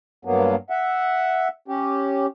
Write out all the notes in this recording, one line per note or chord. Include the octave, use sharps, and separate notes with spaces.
G2 F#3 A#3 B3
E5 F#5
C#4 G4